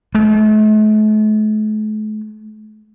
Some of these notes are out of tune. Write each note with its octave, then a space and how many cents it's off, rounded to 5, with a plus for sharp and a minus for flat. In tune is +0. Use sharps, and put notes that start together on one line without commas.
A3 -45